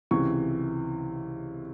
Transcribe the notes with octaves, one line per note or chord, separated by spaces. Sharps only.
C#2 C3 E3 C#6